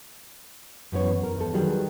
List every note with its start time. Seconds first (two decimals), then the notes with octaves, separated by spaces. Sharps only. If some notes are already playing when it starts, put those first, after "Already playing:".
0.92 F#2 E3 B3 C#5
1.23 A#4
1.36 E2 A4
1.53 D#3 F#3 G3 G#4 B4